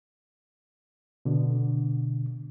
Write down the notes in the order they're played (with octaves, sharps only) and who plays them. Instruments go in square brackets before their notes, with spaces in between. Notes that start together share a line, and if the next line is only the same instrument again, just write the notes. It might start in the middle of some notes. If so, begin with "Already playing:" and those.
[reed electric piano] B2 D3